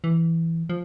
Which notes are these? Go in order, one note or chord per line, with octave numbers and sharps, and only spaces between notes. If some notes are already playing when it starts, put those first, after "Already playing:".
E3
F3